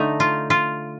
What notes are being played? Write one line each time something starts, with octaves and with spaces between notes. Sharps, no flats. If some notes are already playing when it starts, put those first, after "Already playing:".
Already playing: D3 A3 D#4
F4
F4